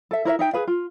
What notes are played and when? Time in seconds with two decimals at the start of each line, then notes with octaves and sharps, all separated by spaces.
0.11 A4 E5
0.25 E4 A#4 C#5 E5
0.39 D#4 E5 G5
0.54 G#4 B4 F5
0.67 F4